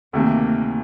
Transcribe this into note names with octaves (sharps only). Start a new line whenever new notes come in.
D2 C3 D#3 A3 A#3